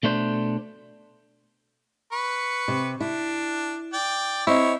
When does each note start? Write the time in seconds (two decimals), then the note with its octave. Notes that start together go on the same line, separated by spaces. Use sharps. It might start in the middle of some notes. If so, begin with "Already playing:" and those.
0.03 B2 A3 D4 C5
2.13 B4 C#6
2.68 C3
3.00 D4 E4
3.93 D5 G5
4.47 C4 E4 C#5 D#5